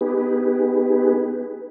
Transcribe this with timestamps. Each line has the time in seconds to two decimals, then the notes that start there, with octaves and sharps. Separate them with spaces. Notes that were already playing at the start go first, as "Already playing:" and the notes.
0.01 B3 D#4 G4 G#4 B4